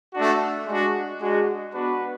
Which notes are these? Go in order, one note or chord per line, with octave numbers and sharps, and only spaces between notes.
A3 D4 F#4
G#3 D4 F#4
G#3 D4 F#4
B3 D4 F#4 B4